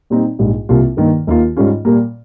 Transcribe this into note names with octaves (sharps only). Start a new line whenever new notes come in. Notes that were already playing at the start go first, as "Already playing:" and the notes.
A#2 G3 C4 D#4
A#1 G#2 G3
C2 C3 G3 A#3 F4
G2 D#3 A#3
D#2 D#3 A#3 F4
G#2 G3 C#4 F4
A#2 G3 A#3